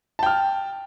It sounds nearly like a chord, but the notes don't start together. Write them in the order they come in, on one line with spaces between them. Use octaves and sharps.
A5 G5 F6